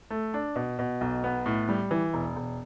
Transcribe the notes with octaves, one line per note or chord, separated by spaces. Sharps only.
A3
D4
B2
B2
B1
B3
A2
G3
E3
E1
E1